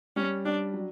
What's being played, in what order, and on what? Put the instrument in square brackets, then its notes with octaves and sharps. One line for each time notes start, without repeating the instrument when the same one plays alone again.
[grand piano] G3 [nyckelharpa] C#4
[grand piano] G3 [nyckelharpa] D4
[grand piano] F#3